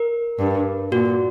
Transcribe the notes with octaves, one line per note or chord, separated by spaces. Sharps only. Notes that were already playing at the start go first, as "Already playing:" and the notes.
Already playing: A#4
G2
A#2 F#4